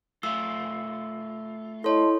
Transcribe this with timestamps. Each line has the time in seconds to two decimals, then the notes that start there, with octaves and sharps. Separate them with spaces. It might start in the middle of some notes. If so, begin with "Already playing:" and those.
0.23 A3 F4 E6
1.84 E4 A4 C#5 D#5 A5 C6